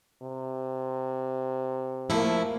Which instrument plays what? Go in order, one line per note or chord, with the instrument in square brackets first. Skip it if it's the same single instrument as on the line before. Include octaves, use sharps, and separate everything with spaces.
[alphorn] C3
[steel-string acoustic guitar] F3 A3 E4 [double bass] A#3